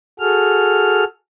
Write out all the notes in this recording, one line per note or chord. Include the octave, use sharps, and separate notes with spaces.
F#4 G#4 A4 F6